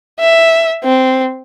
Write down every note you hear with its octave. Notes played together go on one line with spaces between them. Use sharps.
E5
C4